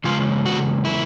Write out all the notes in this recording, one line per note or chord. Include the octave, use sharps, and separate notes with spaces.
E2 C#3 G#3 F4
F#4
E4